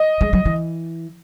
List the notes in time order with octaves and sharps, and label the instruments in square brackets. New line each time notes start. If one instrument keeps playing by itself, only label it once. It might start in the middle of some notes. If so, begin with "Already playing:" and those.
Already playing: [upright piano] D#5
[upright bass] G#3
F#3
E3